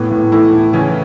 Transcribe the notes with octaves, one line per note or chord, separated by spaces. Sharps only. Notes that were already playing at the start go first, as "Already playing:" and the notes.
Already playing: A2 E3 B3
A2
E3 A3 E4
A2
C#3 E3 C#4